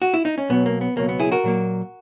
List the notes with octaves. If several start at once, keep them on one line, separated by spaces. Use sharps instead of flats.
F#4
E4
D#4
C#4
B1 B2 F#3 B3
A#3
B3
C#2 B2 F#3 A#3
B3
E4 G#4
F#4 A#4
A#2 F#3 A#3